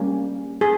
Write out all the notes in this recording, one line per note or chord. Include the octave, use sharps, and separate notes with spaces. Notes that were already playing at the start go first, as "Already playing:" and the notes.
Already playing: G3 A#3 C#4
G#4